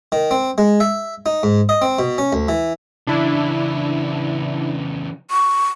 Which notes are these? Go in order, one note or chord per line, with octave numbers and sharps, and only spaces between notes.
D#3
C4
G#3
E5
D#4
G#2
D#5
C4
B2
C#4
D2
E3
C#3 E3 D4 E4
C#6